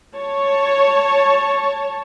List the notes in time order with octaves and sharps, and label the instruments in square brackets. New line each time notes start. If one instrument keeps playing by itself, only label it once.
[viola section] C#5 A5